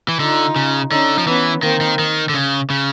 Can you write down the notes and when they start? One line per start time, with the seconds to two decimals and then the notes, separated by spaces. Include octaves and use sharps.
0.08 E3
0.20 D3 D#4 F4
0.56 C#3
0.91 D3 C#4 D#4
1.18 F3
1.27 E3 B3 C#4
1.63 D#3 A#3 C4
1.81 D#3
1.99 D#3
2.29 D3
2.34 C#3
2.70 C#3